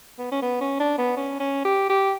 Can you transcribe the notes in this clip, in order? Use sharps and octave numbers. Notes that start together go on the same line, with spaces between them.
B3
C#4
B3
C#4
D4
B3
C#4
C#4
G4
G4